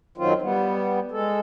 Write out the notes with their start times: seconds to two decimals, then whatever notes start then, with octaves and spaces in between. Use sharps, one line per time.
0.18 F#2 D#3 F#3 C4 F4
0.42 G3 B3
1.11 G#3 A4